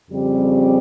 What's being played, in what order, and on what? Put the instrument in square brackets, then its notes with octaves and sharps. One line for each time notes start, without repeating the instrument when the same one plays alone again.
[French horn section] F2 C#3 G3 C4 G4